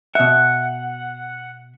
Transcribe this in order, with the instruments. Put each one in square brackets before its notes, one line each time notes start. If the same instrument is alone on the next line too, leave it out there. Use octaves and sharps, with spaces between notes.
[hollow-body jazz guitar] B2 E5 [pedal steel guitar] F#5